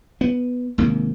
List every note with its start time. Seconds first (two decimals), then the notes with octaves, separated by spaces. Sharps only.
0.21 B3
0.78 G#1 G#2 C3 A#3